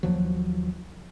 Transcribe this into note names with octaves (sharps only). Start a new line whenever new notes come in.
D#2 F3 F#3